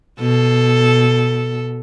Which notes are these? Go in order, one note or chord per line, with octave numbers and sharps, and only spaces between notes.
B2 A4